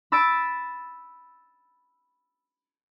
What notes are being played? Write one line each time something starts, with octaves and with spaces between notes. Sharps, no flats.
B5 E6 A6 B6 D7